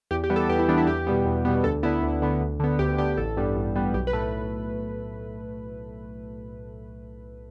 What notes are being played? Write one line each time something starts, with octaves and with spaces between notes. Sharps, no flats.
E2 G4
G4
E3 G3 B3
A4
E2 G4
E4
E3 G3 B3 D4
E4
E2 G4
B2 G3 B3
E2
B2 G3 B3
D2 A4
D3 B3 E4
D2
D3 B3
D2
D3 B3
D2 G4
D3 B3 G4
A1 A4
G2 G3 B3
A1
G2 G3 B3
B1 G4
B4
A2 A3